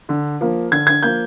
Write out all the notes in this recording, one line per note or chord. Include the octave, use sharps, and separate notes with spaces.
D3
F3 A#3
D3 G#6
G#6
F3 A#3 G6